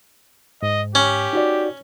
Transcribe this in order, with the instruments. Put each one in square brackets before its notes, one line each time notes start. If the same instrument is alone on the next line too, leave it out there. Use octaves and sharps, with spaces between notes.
[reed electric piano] G#2 [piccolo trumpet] D#5
[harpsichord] C#4 [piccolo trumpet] G4
[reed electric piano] D#4 F#4 D5